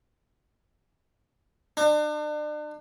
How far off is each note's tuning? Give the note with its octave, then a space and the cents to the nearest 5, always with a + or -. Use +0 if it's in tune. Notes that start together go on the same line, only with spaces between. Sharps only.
D4 +40